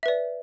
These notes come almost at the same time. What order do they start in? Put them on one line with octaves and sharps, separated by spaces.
E5 B4 D5